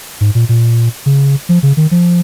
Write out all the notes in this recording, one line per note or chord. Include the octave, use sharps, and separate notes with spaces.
G#2
A#2
A#2
C#3
F3
C#3
D#3
F3